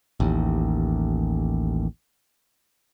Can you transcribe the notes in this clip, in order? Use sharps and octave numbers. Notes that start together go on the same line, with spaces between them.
A1 D#2